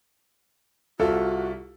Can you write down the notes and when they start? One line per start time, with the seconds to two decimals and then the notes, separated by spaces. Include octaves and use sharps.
1.00 C2 F4 F#4 A4